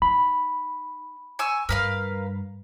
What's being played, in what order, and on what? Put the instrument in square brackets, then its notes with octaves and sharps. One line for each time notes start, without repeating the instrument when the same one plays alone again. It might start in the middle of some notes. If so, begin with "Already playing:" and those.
[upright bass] D#4 [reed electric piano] B5
[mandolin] G#5 C#6 E6
[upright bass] G2 G3 [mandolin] A#4 B4 F5